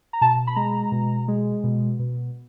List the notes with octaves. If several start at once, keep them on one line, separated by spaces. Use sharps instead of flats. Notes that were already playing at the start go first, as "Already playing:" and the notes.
A#5
B2 A5
B5
G#3 A#5
B2
G#3
B2
B2